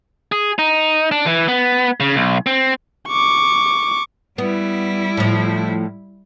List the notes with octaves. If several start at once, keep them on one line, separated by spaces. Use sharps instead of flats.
G#4
D#4
D4
E3
B3
C#3
B1
C4
C#6 D6
G3 B3 E4
A2 F3